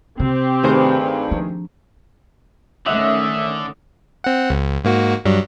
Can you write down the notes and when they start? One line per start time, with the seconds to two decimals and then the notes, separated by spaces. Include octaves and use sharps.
0.20 C3 C4 G4
0.63 G2 D#3 A3 G#4 C5
1.31 F3 D4
2.86 D3 D#3 A3 C#4 D#5 E5 F#5
4.24 C4 F#5
4.50 C#2
4.84 G#2 A#3 F#4
5.25 G2 F#3 G3